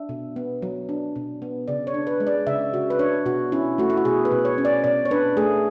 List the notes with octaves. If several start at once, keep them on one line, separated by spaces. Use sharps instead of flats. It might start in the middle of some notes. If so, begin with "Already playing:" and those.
Already playing: D4 E5
B2
B3
F#3
D4
B2
B3
C#3 D5
C#5
D4
B4
G#3
D5
C#3 E5
C#3 F#4
B4
D4 C#5
B2 F#4
C#4 E4
A3 F#4
E4
F#4
B2 G#4
B4
B2
C#5
C#4
D5
B2 D5
C#5
D4 B4
A3 G#4